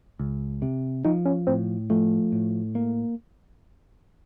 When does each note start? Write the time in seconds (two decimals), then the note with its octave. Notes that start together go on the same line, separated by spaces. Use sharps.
0.19 C#2
0.62 C3
1.05 F3 D#4
1.25 C#4
1.47 A2 C4
1.90 F3 A3
2.32 A2
2.75 A#3